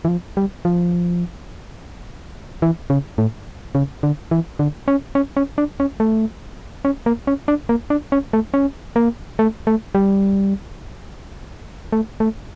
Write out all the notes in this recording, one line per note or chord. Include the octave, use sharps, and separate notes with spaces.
E3
F3
G3
F3
E3
C#3
A2
C#3
D3
E3
D3
C#4
C#4
C#4
D4
C#4
A3
C#4
A#3
C#4
D4
A#3
D4
C#4
A3
C#4
A#3
A3
A3
G3
A3
A3